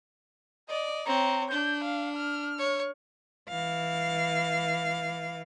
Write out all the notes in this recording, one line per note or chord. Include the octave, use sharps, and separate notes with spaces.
D5 D#5
C4 C#5 A#5
D4 G6
F5
F6
C#5
E3 F5